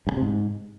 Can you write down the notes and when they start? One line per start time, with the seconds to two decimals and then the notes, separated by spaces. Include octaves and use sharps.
0.07 G2
0.12 C#3
0.17 C3
0.22 G#2